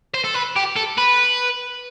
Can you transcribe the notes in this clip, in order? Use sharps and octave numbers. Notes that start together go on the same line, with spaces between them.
C5
A4
B4
G4
A4
B4